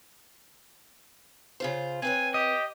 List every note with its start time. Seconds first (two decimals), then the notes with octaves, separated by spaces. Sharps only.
1.60 C#3 F4 C5
2.02 C4 B4 C#5 G#5
2.34 G4 D#5